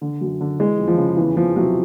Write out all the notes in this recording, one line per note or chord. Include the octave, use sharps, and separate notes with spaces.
D3
F#2
D3
E3 G#3
F2
F3
C#3
E2 E3
E2 F3
C3 F#3